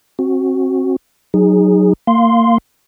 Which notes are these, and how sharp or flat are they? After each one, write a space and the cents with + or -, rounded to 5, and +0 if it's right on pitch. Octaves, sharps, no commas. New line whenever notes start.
C4 +30 F#4 +0
F#3 +0 D#4 +0 G#4 -15
A#3 -30 F5 +0 C6 -5